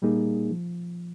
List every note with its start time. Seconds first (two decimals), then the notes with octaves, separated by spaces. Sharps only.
0.02 A#2 G3 A#3 D#4 G#4
0.51 F3